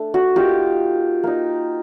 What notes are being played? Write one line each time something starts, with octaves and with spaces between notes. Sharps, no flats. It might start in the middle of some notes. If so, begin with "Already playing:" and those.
Already playing: A3 D4
F#4
A#3 D#4 F4 G4
A#3 D#4